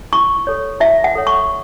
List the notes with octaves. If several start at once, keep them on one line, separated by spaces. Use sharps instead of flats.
E4 C#6
A4 C#5
E4 E5
F#5
A4 C#5
C#6